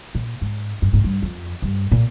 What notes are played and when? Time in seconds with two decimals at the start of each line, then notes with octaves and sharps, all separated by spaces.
0.15 A#2
0.42 G#2
0.82 G2
0.93 G#2
1.04 G2
1.22 F2
1.62 G2
1.92 A#2